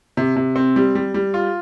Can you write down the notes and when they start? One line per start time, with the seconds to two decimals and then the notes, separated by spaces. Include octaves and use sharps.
0.17 C3
0.36 C3
0.56 C4
0.76 G3
0.95 G3
1.14 G3
1.34 F4